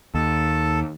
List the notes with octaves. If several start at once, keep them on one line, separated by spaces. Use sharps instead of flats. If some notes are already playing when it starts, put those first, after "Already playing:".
D#2 A4 A5